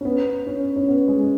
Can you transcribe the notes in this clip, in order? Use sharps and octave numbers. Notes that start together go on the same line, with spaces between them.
C#4
B3
C#4
C#4
B3
G#3